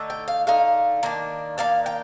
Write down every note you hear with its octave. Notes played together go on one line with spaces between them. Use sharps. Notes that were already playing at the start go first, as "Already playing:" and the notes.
Already playing: D3 A3 D#4
G5
F5
D3 A3 D#4 F5
D#3 A#3 D4
D#3 A#3 D4 F5
G5